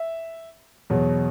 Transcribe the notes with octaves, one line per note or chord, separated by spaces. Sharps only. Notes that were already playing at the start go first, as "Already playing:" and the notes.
Already playing: E5
E2 B2 F#3